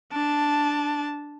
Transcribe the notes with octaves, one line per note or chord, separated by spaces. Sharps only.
D4 A5